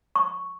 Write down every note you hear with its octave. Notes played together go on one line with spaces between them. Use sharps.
C#6